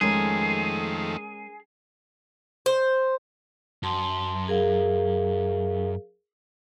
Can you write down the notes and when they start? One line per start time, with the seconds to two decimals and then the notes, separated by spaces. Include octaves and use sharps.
0.01 F2 D#3 G#3 A3 C#4 G#4 A#4
2.66 C5
3.83 F#2 A5 C6
4.48 G#4 A#4 F5